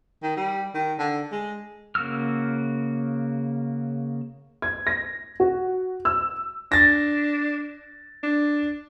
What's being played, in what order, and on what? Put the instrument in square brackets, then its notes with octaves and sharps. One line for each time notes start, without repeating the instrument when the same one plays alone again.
[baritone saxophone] D#3
G3
D#3
D3
G#3
[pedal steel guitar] C#3 A#3 F#4 E6 F6
[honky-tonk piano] G#6
A#6
F#4
E6
[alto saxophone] D4 [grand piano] A6 A#6
[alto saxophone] D4